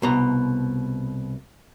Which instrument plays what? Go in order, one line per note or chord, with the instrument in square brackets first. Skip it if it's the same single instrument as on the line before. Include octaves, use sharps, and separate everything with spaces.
[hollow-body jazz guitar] C2 B2 A#5